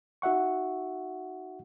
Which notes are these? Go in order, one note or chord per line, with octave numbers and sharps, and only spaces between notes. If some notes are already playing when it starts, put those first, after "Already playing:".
D#4 F#4 E5 F#5 C#6